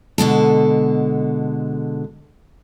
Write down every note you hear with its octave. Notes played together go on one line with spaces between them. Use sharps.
B2 D3 G#3 A4